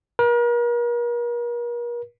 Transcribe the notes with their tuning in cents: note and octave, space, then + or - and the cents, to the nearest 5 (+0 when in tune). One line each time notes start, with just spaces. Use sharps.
A#4 +40